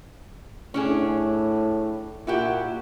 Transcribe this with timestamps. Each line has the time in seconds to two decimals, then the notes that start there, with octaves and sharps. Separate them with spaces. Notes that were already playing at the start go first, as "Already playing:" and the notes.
0.74 A2 C#4 D4 G#4
2.27 A#2 E4 F#4 G4